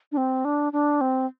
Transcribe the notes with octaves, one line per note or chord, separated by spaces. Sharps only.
D4
C4
D4
D4
C4